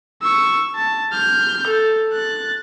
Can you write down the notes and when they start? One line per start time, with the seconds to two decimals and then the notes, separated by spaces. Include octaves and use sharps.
0.22 C#6 E6
0.75 A5
1.12 F6 G6
1.67 A4
2.13 F#6 A6